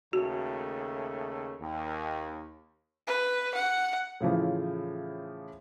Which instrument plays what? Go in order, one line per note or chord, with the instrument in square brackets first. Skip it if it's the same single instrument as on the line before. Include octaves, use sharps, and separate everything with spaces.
[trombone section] D#2 C#3 A3 [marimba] F#4
[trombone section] D#2
[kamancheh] B4
F#5
[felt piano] A2 C#3 E3 F3